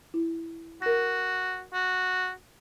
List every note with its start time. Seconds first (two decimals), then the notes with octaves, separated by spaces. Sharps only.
0.14 E4
0.82 F#4 A#4 A#6
1.74 F#4